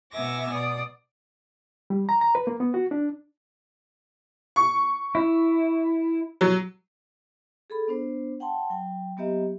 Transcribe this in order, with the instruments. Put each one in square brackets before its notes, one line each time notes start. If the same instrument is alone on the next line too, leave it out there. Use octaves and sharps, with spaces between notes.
[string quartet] B2 B3 E5 G#5 D6 A#6
B2 D5 D#6
[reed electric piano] G3
A#5
A#5
B4
A#3
B3
F#4
D4
[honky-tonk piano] C#6
[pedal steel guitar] E4
[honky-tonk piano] F#3
[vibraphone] G#4 A4 B5
B3 D4 C5
F#5 G5 A5 C6
F#3 G5
F#3 A#3 B3 G4 D#5 E5